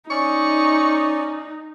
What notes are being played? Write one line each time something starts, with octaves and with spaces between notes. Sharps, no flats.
C#4 D#4 D5 C#6